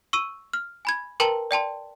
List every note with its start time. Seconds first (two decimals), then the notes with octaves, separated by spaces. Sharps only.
0.13 C#6 E6 D#7
0.53 F6
0.85 G#5 B5 G#6
1.20 A#4 B4 G5 A5 A#5 C6
1.51 D5 G5 A5 C6